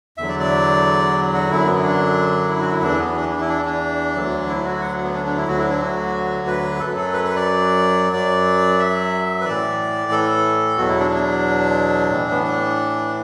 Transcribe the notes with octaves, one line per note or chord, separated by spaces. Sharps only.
E2 D3 F#3 E5
D5
D5
F#4
F#2 D3 F#3 E4
B3
D4
E4
F#4
E4
E2 E3 D4
B3
D4
D4
E4
D4
D4
D2 D3 F#3
E4
F#4
F#5
B3
D4
D4
E4
D2 D3 F#3 F#4
E4
D4
F#4
B4
F#2 F#3 A4
A4
B4
B4
D5
F#2 F#3 D5
E5
B4
A2 E3 D5
A4
E2 B2 F#3 F#4
E4
D4
D4
A2 E3
B3
D4